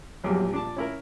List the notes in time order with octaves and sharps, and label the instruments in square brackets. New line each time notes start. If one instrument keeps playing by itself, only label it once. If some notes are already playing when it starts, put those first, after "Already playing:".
[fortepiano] A#1 E2 G3 [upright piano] F#3
[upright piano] A#2
[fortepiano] D4 A5
C#4 E4 A#4